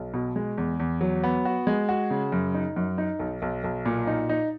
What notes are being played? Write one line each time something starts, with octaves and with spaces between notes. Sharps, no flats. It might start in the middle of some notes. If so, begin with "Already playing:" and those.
Already playing: B1
B2
G#3
E2
E2
F#3
B3
F#4
G#3
F#4
C#3
F#2
D#4
F#2
D#4
B1
B1
B1
A#2
D#4
D#4